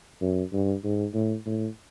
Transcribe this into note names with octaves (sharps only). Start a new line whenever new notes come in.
F#2
G2
G#2
A2
A2